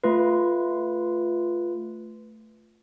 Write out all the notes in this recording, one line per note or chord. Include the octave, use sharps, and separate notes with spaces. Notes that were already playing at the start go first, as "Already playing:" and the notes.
A3 F4 B4